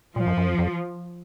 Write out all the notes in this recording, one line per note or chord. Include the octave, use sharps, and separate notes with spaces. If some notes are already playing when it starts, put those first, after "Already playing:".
A#2 F3
F#2
F#2
F2
F2